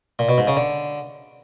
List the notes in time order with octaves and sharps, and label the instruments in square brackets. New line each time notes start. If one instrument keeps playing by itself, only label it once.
[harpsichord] A#2
B2
G#2
C#3
D3